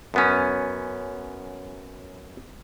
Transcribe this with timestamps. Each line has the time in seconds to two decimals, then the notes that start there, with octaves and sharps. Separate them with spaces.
0.14 F#2 B3 C#4